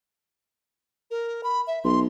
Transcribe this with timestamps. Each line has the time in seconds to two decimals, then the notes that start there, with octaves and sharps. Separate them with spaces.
1.11 A#4
1.44 B5
1.67 E5
1.84 B1 C6